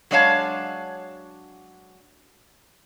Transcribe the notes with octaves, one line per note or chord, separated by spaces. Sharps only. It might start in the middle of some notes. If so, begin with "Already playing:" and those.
F#3 G#3 D4 C#5 F5 A5